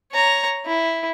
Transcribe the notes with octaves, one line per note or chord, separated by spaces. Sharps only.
C#5 A#5
E4